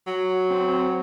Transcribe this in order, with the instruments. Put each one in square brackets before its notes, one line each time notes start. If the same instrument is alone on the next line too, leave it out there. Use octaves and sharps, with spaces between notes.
[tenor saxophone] F#3
[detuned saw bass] C4